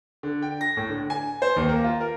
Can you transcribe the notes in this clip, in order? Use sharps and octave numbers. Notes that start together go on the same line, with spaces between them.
D3
G5
A#6
A2
D3
G#5
C5
D#2
A#3
F4
A#4